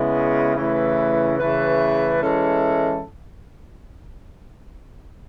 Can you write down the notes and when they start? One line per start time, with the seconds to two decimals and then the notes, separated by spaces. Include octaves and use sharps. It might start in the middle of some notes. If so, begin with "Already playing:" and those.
Already playing: C#3 G#3 B3 E4
0.55 C#3 E3 A3 E4 B4
1.38 C#3 E3 A3 E4 B4
2.21 E3 G#3 C#4 E4 A4